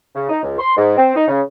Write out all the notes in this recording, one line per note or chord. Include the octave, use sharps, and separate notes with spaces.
C#3
D#4
C#2
C6
G#2
C4
D#4
C#3